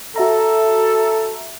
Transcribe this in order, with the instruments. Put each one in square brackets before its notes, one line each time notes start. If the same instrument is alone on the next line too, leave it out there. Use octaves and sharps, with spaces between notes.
[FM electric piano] F#4 E5 A#5 [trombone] A4